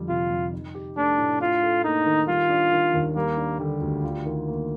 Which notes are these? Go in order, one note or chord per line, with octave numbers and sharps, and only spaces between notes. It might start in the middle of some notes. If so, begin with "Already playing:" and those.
Already playing: F2 D3 G3
C3 F4
F2
D#4
G4
A3 D4
A2
D4 F4
A4
A#3 D#4
D#3
G3 F4
D4
D#3
D#2
G3 A#3
D4
D3 G3
D2
F4
D#3
A#3